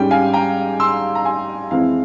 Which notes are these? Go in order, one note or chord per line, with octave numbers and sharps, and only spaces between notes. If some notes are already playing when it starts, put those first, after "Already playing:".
Already playing: G#2 G3 C#4 G5
F5 G#5
G5 A#5
C6 E6
A#5
G#5 C6
F2 E3 G#3 C4 E4 F5